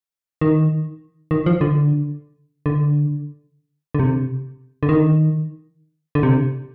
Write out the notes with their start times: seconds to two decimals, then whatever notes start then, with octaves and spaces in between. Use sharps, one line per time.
0.41 D#3
1.31 D#3
1.46 F3
1.61 D3
2.66 D3
3.95 D3
4.00 C3
4.83 D3
4.89 D#3
6.15 D3
6.23 C3